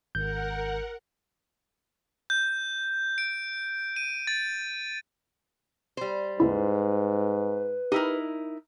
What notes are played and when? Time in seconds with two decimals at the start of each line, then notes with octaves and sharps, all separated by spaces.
0.15 G#1 A#4 F#5 G6
2.30 G6
3.18 D7
3.96 D#7
4.27 A6
5.97 G3 C5
6.40 D#2 G#2 C#3 E4 B4
7.92 D#4 E4 G4 A#4